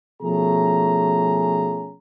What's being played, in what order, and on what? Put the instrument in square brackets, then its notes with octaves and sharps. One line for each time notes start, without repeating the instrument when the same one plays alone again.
[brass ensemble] B2 F3 A3 C#4 G#4 A#5